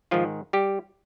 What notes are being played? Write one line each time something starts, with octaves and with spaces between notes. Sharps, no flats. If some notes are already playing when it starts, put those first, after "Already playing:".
G#2 D#3 F3 F4
G3 G4